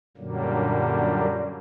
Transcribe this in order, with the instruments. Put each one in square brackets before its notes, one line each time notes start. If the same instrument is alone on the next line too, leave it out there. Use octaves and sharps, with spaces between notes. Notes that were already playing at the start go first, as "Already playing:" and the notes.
[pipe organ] F#2 A#2 D3 F#3 G3 A#3